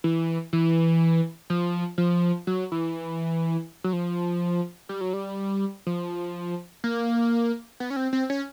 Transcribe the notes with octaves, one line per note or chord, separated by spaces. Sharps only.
E3
E3
F3
F3
F#3
E3
F#3
F3
G3
F#3
G3
F3
A#3
B3
C#4
C4
C4
C#4